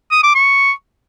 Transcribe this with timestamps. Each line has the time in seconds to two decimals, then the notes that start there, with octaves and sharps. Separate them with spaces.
0.12 D#6
0.23 D6
0.35 C#6